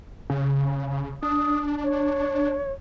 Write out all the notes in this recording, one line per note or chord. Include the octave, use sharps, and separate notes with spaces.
C#3
D4 D#6
C#5